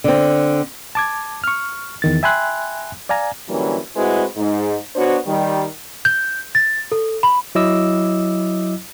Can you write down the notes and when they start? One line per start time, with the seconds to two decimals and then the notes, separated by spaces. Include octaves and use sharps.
0.04 D3 C4
0.95 A5 D6 G#6
1.44 C#6 F6
2.02 E2 D#3 A6
2.23 E5 G5 G#5 B5 C6 F#6
3.09 D5 F5 G#5 A#5
3.49 D3 E3 F#3 G3 A#3 C#4
3.96 A2 G#3 C4 E4 F#4 B4
4.37 G#2
4.96 B3 D4 F#4 C5 C#5
5.26 D#3 G3
6.05 G6
6.55 A6
6.92 A4
7.23 B5
7.55 F#3 E4 D#5 D6 E6